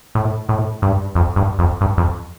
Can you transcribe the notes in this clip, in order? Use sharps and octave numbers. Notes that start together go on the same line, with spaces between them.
A2
A2
G2
F2
G2
F2
G2
F2